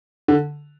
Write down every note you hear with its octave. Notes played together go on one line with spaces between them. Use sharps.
D3